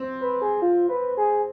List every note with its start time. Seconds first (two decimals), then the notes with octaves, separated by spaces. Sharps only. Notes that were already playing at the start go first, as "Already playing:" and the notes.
Already playing: C4
0.21 B4
0.41 G#4
0.62 F4
0.89 B4
1.17 G#4